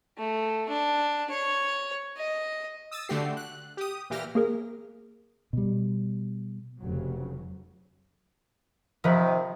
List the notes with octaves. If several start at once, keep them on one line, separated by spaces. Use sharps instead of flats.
A3
D4
C#5
D#5
D#6 E6 A6
D3 A3 F#4 G4 C7
F#6
G4 D#6
A#2 E3 G4 F6 A#6
A#3 G#4 A#4
B2 G3
F1 C#3 F#3
C3 D#3 F3 B4